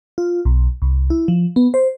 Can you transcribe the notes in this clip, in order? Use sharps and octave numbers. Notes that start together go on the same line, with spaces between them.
F4
B1
C2
E4
F3
B3
C5